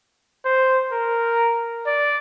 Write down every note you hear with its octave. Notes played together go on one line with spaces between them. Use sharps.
C5
A#4
D5